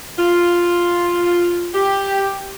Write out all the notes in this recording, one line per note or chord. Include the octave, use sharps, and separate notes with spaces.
F4
G4